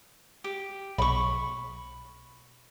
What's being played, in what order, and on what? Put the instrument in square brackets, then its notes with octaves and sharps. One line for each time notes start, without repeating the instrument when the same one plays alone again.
[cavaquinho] G4
[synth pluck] B1 [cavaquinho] B5 C#6